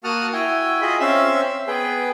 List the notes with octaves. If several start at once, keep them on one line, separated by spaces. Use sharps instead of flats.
A#3 F#4 F#5 A5 D#6 F6
E4 F#4 G5 G#5
F4 G#4 D#5 B5
C4 C#4 E5 F5 E6
B3 G#4 B4 G5